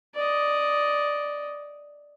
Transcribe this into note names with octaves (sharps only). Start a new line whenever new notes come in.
D5 D#5